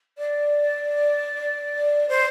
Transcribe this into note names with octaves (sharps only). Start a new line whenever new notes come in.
D5
C5